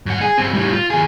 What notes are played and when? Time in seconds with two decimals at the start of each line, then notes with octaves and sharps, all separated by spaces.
0.06 F#2 F#5
0.21 G#4
0.38 G2 C4
0.54 A2 G3
0.72 F4
0.90 D#2 G#4